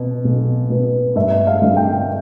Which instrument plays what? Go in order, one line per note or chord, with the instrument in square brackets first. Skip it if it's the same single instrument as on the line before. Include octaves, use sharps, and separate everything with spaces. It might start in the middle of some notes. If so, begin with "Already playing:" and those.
Already playing: [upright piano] B2 B3
B1
B2 B3
G2 E5
F5
D3 G3 D4
G5